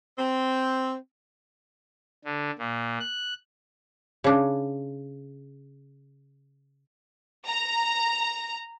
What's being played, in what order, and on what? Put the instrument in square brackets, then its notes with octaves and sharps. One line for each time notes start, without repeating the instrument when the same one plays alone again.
[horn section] C4
[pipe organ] D3
A#2
F#6
[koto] C#3 D4
[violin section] A#5